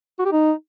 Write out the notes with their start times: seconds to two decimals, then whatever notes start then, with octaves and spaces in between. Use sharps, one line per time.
0.19 F#4
0.25 G4
0.32 D#4